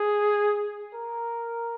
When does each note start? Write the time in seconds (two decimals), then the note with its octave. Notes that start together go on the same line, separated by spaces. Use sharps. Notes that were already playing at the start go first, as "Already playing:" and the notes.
Already playing: G#4
0.94 A#4